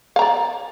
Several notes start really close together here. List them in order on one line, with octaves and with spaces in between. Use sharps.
F5 A#5 D5